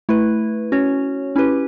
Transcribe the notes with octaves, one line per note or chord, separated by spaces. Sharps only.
A3 E4 B4
C#4 F#4 C#5
C#4 E4 G4 B4